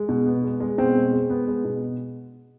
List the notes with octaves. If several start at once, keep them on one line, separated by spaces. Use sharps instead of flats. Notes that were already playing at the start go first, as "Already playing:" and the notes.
Already playing: G#3
B2
B3
G#3
G#3
B2 C4
G#3
G#3
B3
G#3
B2